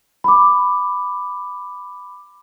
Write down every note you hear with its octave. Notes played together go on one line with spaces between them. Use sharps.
B5 D6